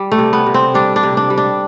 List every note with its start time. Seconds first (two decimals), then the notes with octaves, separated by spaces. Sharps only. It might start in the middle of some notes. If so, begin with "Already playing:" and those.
Already playing: G3
0.12 A3
0.18 C3
0.33 B3
0.46 C3
0.54 C4
0.74 G3 D4
0.96 D4
1.03 C3
1.17 D4
1.30 G3
1.38 D4